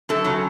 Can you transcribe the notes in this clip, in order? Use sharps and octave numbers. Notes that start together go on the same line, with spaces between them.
F#2 A4
C#3 F#3